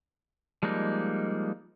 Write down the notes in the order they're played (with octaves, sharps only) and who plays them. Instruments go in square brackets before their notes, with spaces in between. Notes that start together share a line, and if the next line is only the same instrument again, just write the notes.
[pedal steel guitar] F3 G3 G#3 A#3 D#4